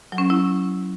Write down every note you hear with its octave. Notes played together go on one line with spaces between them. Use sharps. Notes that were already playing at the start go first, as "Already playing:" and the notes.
F#3
C#4
F#3
E4